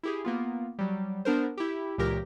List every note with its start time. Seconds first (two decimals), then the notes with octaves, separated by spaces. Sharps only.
0.03 E4 G4 G#4
0.24 A#3 B3 F4
0.79 F#3 G3
1.25 B3 D4 A#4 C5
1.58 E4 G4
1.98 C#2 A#2 E3 G4 A#4 A#6